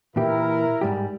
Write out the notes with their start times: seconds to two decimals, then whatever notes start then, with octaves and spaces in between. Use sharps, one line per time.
0.16 A#2 E3 E4 G4 A#4
0.81 G#2 G3 G4